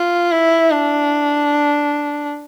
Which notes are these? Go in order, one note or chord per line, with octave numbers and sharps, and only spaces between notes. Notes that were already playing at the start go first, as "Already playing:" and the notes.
Already playing: F4
E4
D4